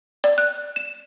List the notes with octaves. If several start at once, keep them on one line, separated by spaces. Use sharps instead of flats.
D5
F#6
E7